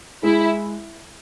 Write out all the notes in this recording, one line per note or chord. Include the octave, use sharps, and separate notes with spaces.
G#3 E4